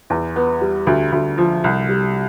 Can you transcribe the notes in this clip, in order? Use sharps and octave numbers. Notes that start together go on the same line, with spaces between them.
E2
B3
G3
D2
D2
F3
C2
G3